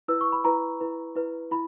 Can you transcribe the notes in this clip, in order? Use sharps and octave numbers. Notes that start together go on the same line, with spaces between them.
E4 B4 E6
C#6
B5
E4 B4 A#5
E4 B4
E4 B4
E4 B5